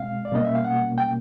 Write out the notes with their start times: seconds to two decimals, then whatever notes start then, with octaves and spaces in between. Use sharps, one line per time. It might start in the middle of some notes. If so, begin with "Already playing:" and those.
Already playing: B2 G#3 C4 F5
0.25 D5
0.32 B2 G3 A#3 C#4 D#5
0.45 E5
0.55 F5
0.65 F#5
0.98 G5